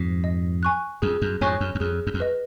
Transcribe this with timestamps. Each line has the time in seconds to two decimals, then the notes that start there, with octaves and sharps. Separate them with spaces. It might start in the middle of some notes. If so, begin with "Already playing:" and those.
Already playing: F2 G#2
0.24 D#5
0.63 G#5 C#6 F#6
1.02 F2 G#4
1.22 F#2
1.41 F2 G#2 C#5 G#5 C#6 F#6
1.61 F#2
1.75 F#2
1.80 F2 G#4
2.07 F#2
2.14 F2
2.20 B4 D#5